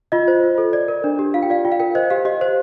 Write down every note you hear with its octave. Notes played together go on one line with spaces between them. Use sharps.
F4 D#5
C5
F4
A4
D5
A#4
D4
G4
F4 F5
G5
D5 F5
F4 G5
F5
A#4 G5
C5 D#5
G4 F5
G4 D#5
C5